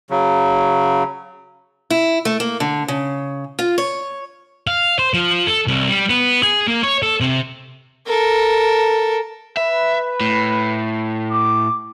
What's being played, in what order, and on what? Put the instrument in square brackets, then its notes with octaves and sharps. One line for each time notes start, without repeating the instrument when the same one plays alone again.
[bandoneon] C#3 F#3
[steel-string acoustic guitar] E4
A3
A#3
D3
C#3
F4
C#5
[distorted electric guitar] F5
C5
F3
A4
C2
G3
B3
G#4
A#3
C#5
A4
C3
[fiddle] A4 A#4
[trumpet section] B4 [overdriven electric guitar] E5
[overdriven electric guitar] A2
[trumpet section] D6